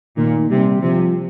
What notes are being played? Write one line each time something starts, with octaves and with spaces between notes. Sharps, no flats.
A#2 D#3
C3 G3
C3 F3